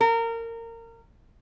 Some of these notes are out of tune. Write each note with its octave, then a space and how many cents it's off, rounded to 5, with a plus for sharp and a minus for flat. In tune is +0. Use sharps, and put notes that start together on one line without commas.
A#4 -25